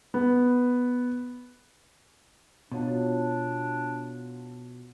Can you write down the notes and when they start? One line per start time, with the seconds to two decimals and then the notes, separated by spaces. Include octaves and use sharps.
0.14 B3
2.72 B2 F#3 D4 F4